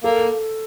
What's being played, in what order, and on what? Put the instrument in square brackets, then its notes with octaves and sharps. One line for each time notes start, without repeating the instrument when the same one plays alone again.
[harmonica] A#3 [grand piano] A4